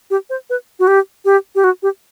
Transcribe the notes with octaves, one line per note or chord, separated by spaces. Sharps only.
G4
C5
B4
F#4
G4
G4
G4
F#4
G4